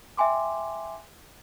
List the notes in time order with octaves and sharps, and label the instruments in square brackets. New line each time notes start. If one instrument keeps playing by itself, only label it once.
[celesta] E5 G5 G#5 C6 D6